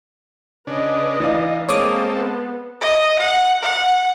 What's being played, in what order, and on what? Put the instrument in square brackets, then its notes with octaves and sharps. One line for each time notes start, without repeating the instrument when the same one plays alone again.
[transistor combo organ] C#3 D4 [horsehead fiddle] B4 D#5
[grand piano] E3 D5 F5 [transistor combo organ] D#4
[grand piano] G#3 [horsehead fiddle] A#3 [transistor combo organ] C4 A4 [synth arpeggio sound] C#5 D6 D#6
[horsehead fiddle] B3
[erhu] D#5
F#5
F#5